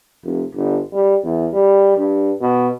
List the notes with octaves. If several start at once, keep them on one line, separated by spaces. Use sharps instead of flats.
F1
G1
G3
E2
G3
G2
B2